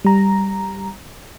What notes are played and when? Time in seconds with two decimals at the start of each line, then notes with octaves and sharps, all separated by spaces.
0.05 G3 A#5